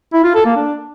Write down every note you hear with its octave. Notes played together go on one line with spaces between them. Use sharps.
E4
F4
A4
A#3
D4